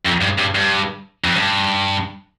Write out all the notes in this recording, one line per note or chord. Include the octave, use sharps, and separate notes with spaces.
F2
G2
G2
G2
F2
G2